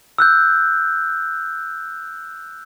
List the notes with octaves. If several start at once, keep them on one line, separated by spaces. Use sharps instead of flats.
E6 F#6 G6